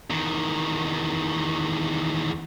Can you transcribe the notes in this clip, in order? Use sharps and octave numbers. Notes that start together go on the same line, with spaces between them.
E2 D#3